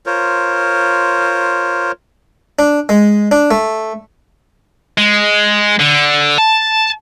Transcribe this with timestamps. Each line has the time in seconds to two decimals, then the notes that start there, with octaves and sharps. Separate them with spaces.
0.06 F4 A#4 C5 C#5
2.59 D4
2.89 G#3
3.31 D4
3.51 A3
4.98 G#3
5.79 D3
6.38 A5